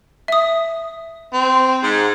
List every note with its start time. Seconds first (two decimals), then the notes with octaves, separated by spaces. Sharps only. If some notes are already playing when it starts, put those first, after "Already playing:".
0.28 E5 D#6
1.33 C4
1.83 G#2